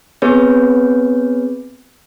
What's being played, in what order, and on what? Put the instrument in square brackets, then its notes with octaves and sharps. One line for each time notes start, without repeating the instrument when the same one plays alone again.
[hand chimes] B3 C4 G#4 B4 C#5